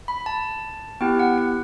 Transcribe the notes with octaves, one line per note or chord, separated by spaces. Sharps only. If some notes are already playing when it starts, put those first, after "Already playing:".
B5
A5
B3 E4 G4 G5
F#5
F#5